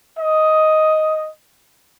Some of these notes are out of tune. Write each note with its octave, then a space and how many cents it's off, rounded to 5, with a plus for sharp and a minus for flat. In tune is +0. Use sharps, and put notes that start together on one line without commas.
D#5 +5